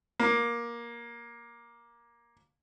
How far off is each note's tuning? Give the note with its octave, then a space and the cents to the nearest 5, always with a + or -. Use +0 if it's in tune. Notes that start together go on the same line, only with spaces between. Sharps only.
A#3 +15